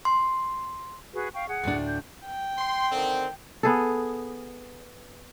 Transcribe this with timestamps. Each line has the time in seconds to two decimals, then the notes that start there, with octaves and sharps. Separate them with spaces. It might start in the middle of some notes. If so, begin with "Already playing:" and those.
0.05 C6
1.13 F#4 G#4 B4
1.34 F5 G5 C#6
1.48 G#4 F#5
1.63 D2 A2 D4
1.87 G6
2.26 G5
2.58 C6
2.91 D3 D#3 C4
3.63 B3 G#4 A4